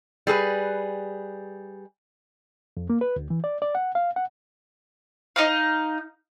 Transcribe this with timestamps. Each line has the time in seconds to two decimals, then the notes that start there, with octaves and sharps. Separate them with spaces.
0.27 G3 G#4 A4 B4
2.77 F2
2.90 A#3
3.01 B4
3.16 D2
3.30 E3
3.44 D5
3.62 D5
3.75 F#5
3.95 F5
4.16 F#5
5.36 D#4 D#5 F5